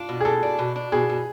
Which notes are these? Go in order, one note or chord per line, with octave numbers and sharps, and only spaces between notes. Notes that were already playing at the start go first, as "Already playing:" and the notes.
Already playing: D4 F4
B2
G#4
B2 A4
D4
B2
D4
B2 G#4
B2